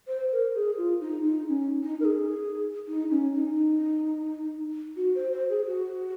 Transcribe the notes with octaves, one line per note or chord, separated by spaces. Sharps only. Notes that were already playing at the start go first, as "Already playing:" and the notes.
C5
A#4
G#4
F4
D#4
D#4
C#4
D#4
A#4
G#4
D#4
C#4
D#4
F#4
C5
C5
G#4
F#4